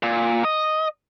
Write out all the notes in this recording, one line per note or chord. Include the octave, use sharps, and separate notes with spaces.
A#2
D#5